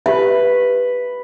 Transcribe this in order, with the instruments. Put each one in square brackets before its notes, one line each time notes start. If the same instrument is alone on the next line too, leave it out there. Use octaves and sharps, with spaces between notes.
[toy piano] G4 E5 [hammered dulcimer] B4